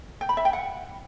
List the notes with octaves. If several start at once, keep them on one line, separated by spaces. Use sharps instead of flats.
G5
B5
E5
G5
F#5